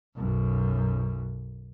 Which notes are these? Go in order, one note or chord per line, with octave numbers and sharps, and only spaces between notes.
B1 F#2